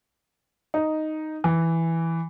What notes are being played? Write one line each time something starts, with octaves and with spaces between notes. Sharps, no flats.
D#4
E3